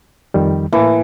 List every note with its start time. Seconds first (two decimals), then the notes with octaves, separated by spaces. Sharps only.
0.34 F2 D#3 G3
0.73 A2 E3 A#3